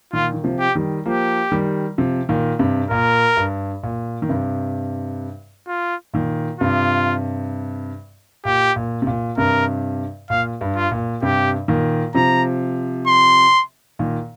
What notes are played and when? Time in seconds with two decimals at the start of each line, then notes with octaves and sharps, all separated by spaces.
0.13 A#2 D#3 F4
0.33 D#3
0.44 C3 F3
0.60 G4
0.75 D#3 G3
1.06 F3 A#3 G4
1.52 D#3 G3
1.98 C3 F3
2.29 A#2 D#3
2.59 G2 C3
2.90 A#2 A#4
3.37 G2
3.83 A#2
4.22 D#3
4.29 G2 C3
5.68 F4
6.14 A#2 D#3
6.60 G2 C3 F4
8.45 A#2 G4
8.76 A#2
9.02 C3
9.07 A#2
9.38 G2 C3 A#4
10.30 A#2 F5
10.61 G2
10.76 F4
10.91 A#2
11.22 G2 C3 G4
11.68 A#2 D#3
12.14 C3 F3 A#5
13.07 C6
13.99 A#2 D#3